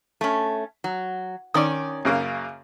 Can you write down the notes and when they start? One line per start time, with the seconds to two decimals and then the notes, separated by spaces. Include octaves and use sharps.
0.21 A3 C#4
0.84 F#3
1.54 D#3 C#4 D5 D#6
2.05 F#2 C#3 A#3